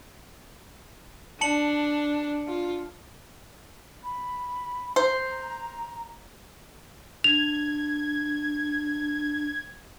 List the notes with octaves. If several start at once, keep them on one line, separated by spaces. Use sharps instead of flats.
D4 A5 C#7 F#7
F4
B5
C5 A#5
D4 G#6 F7